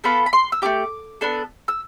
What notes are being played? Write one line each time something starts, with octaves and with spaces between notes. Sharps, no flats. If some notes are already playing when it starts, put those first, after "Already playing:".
B3 F4 A4 B5
B5
C6
E6
A3 E4 G4 D6
B3 D4 A4
E6